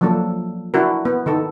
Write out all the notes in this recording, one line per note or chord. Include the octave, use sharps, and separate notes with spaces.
F3 F#3 A#3 D4 A4
D4 E4 F#4 A#4
B3
D#3 D#4 A4